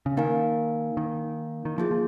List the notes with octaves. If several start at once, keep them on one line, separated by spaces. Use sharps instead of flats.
C#3
D#3 A#3 D#4 A#4 F5 G#5
D#3
D#3
F3 A#3 F4 G#4
F3